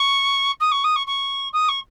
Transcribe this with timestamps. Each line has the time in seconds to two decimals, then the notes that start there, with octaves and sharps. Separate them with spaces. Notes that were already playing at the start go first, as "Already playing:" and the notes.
Already playing: C#6
0.60 D#6
0.72 C#6
0.84 D#6
0.96 C#6
1.07 C#6
1.53 D#6
1.69 C#6